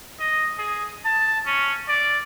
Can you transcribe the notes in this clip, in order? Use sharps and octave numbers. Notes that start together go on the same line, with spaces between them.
D#5
G#4
A5
C#4
D5